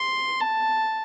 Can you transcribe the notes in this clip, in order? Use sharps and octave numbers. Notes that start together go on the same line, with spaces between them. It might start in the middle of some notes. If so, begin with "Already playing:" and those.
Already playing: C6
A5